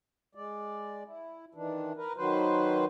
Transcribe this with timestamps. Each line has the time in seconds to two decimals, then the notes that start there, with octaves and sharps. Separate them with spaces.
0.35 G#3 D5
1.06 E4
1.55 D#3 E3 D4
1.96 A#4 B4
2.17 D#3 F#3 B4 C5